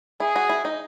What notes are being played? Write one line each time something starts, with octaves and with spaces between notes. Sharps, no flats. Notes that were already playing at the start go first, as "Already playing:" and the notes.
E4 G#4
F#4
E4
D#4